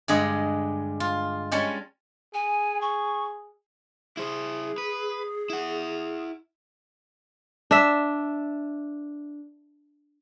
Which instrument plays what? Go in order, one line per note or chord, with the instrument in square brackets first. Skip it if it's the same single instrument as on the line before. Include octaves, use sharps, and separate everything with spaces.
[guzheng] G2 D3 G#3 G#4 D#5 F#5
F4
G3 G#3 C#4 C#5 G#5 A5
[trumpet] G#4 [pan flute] G#5
[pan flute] C#6
[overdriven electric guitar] E4 C5 [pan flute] G#4
[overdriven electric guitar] B4
E4 F#5
[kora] D4 E5